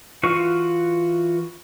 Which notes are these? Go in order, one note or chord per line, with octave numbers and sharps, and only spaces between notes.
E3 F4 F#4 B4 C#6